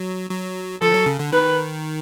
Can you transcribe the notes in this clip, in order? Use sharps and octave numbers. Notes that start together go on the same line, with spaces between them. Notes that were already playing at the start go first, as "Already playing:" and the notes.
Already playing: F#3
F#3
F3 A4
F#3
C#3
D3
D#3 B4